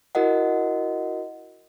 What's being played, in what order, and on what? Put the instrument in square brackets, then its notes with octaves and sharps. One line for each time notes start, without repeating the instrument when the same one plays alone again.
[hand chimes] E4 F#4 A#4 D#5 F#5